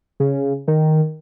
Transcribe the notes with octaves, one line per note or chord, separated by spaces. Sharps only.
C#3
D#3